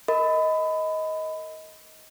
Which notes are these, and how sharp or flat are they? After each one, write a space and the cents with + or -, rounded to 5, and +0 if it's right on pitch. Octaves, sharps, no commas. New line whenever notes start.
A#4 -20 D#5 +20 B5 +20